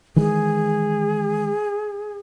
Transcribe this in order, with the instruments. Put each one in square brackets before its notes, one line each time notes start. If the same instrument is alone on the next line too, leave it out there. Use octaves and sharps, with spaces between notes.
[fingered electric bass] D#3 E3 G#3 [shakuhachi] G#4